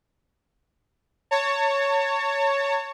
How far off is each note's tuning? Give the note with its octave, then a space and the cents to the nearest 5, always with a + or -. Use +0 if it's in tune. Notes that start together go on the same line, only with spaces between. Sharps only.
C#5 +5 A5 +40